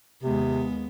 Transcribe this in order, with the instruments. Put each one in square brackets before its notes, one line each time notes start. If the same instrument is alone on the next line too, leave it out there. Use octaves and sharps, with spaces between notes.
[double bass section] D#2 G#3 [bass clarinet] C3 [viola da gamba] B3